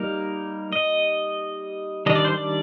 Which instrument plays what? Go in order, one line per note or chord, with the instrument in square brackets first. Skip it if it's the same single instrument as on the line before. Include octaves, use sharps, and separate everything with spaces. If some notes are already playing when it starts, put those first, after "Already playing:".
Already playing: [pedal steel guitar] G3 A#3 D#4 A#4
D#5
D#3 G3 D4 D#5
D5
C5
D5